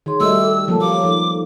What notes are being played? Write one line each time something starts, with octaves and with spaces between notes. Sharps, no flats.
D#3 G#4 C#5 C6
G3 A3 F#4 D#5 E5 E6
A4 D6
F3 F#3 A#3 A4 A5
G4 C#5 F5 D6
F3 D#4 A4